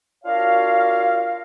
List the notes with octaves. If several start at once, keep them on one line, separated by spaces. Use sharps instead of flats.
D4 F4 F#4 A#4 C#5 F5